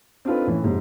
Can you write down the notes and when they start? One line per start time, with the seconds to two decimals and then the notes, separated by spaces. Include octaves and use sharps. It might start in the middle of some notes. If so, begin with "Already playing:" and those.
0.25 C4 D4 D#4 F4 A4 B4
0.47 A2 E3 C#4
0.62 F2 G#2 C3